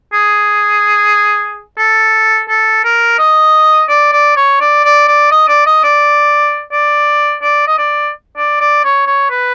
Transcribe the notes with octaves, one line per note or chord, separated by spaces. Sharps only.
G#4
A4
A4
A#4
D#5
D5
D5
C#5
D5
D5
D5
D#5
D5
D#5
D5
D5
D5
D#5
D5
D5
D5
C#5
C#5
B4